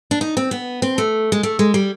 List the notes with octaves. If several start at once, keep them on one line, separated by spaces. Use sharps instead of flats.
D4
D#4
C4
B3
C4
A3
G#3
A3
G#3
G3